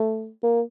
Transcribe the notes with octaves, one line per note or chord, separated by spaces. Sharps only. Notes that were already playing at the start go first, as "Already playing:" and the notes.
Already playing: A3
A#3